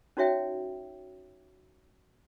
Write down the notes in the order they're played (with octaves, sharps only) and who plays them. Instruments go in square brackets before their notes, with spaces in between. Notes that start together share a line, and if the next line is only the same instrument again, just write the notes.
[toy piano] C#4 D#4 F#4 C#5 E5 G5